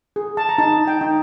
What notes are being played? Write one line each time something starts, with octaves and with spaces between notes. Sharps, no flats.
G#4
A5
A#5
D#4 A5
G5
D#4